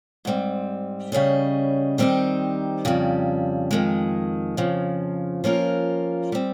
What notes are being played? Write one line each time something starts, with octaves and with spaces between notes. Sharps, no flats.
G#2 G3 C4
C#3 G3 C#4 G#4 D#5
D#3 G3 C4 D#4 G4
F2 C#3 G3
F2 D#3 G#3
F2 C#3 F3
F3 A#3 C#4 F4 A#4
G3 C4